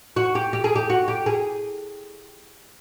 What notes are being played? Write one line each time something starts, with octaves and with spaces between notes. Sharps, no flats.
F#4
G4
G4
G#4
G4
F#4
G4
G#4